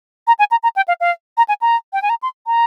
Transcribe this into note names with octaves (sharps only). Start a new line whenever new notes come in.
A#5
G#5
A#5
A#5
G5
F5
F5
A#5
G#5
A#5
G5
G#5
A#5
C6
A#5